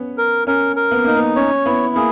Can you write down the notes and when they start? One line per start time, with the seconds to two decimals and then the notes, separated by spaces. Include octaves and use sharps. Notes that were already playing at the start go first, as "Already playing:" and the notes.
Already playing: B3 C#4
0.18 A#4
0.47 C#4 A#4
0.76 A#4
0.91 B3
1.04 A#3 D#4
1.16 B3
1.36 C#4 C#5
1.66 B3 E4
1.96 A#3 G#4